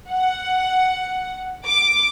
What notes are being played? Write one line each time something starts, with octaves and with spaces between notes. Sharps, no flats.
F#5
D6